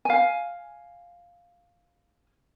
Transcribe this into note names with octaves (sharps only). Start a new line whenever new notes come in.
F5 G#5